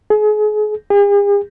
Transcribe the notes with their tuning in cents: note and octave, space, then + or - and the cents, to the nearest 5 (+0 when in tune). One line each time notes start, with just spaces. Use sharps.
G#4 +35
G#4 -45